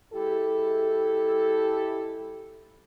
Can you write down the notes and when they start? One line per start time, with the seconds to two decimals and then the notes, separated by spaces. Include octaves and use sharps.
0.13 G#3 E4 G4 A4